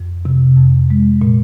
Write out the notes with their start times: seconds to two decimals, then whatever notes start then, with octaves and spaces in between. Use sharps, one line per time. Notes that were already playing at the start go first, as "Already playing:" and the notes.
Already playing: F2
0.25 C3
0.57 F2
0.90 G#3
1.22 A#2